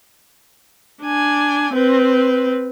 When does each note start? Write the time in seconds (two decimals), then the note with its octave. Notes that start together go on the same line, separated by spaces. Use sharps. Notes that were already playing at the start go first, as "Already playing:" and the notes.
1.03 D4 G#5
1.73 C4 B4